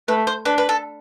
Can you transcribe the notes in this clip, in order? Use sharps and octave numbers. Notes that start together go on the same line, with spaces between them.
A3 B4
C5
D4 B4
B4
A4